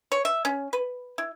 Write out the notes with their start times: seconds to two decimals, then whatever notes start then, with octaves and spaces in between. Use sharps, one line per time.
0.12 C#5
0.25 E5
0.45 C#4
0.73 B4
1.18 E4